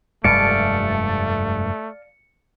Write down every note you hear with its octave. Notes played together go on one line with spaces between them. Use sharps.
F1 G2 G#3 A3 D5 F5 A5 C#7